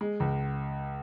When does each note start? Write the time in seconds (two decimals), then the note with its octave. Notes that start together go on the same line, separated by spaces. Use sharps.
0.01 G#3
0.20 C#2